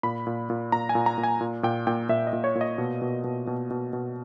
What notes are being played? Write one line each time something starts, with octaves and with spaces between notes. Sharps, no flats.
A#2 B5
A#2
A#2
A#2 A#5
G#5
A#2
A#5
A#2
G#5
A#2
A#2 G5
A#2 G5
A#2 E5
D#5
A#2
C#5
A#2
D#5
B2
B2
B2
B2
B2
B2